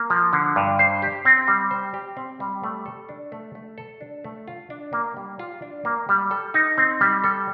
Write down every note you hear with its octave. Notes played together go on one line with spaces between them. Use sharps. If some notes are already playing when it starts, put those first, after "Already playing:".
Already playing: A#3
F3
D3
G2
C5
G4
C4
G3
C5
G4
C4
G3
A3
A4
D4
A3
A3
A4
D4
A3
F4
D4
A#3
G3
F4
D4
A#3
G3
A4
D#4
C4
G3
A4